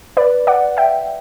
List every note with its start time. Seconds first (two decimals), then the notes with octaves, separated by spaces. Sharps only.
0.17 B4 D5
0.47 D5 F#5
0.77 E5 G5